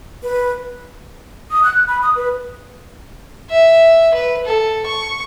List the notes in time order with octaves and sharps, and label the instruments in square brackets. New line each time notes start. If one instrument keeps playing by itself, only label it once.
[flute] B4
[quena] D#6
F#6
B5
D#6
B4
[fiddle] E5
B4
A4
C#6